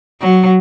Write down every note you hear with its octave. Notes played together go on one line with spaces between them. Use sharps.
F#3